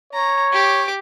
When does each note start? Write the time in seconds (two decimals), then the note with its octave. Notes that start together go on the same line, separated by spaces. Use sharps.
0.13 C#5 A#5
0.53 G4 D6